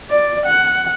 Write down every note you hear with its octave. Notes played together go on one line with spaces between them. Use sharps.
D5
F#5